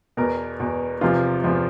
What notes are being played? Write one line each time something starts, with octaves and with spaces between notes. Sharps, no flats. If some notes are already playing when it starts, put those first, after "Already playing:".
E2 B2 A#4
E2 B2
E2 C3 F3 F4
E2 C3 F3